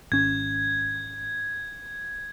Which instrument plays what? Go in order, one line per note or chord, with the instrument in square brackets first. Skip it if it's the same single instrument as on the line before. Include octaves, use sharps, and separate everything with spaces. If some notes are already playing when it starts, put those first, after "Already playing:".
[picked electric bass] G#1 C#4 [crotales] G#6